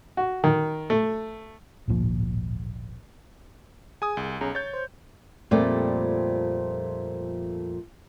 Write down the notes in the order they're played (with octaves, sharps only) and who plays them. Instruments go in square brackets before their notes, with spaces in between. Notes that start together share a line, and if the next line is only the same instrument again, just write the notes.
[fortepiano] F#4
D#3
A3
[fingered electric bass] D1 G#1 A#2 F3
[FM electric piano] G#4 [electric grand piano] G#5 D#6
[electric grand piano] C2
[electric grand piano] B1 [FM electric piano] C#4 G#4 A#5
[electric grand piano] C#5 G6 [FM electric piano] A6
[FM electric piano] C5
[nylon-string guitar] F2 A#2 F3 G3 A3 D5